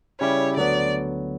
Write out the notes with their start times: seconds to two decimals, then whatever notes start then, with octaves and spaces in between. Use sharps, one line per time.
0.20 C#3 G3 C#4 E4 G4 C#5
0.56 D2 D3 F#3 B3 D5